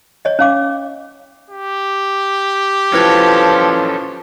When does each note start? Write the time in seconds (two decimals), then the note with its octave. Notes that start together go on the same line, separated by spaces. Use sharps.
0.25 C#5 D#5
0.39 C#4 F5 D6
1.50 G4
2.94 F3 C#4 E4 F4 A4 B4 G#6